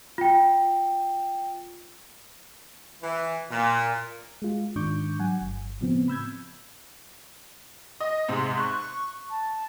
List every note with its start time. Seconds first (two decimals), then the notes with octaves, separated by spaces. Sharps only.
0.18 F4 G5
3.02 E3
3.50 A#2
4.42 G#3 F4
4.76 G#2 D#3 D4 C#6 D6 G6
5.19 F#3 F#5 G#5
5.41 G1
5.81 A2 C#3 F3 B3 C4
6.08 B5 E6 G6 G#6
8.00 D#5
8.28 G#2 C3 G#3
8.58 C#6 F#6
9.30 A5